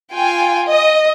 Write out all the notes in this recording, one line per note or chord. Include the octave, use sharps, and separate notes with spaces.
F4 G5 G#5
D#5